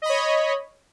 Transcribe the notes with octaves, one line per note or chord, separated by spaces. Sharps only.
C#5 D#5 B5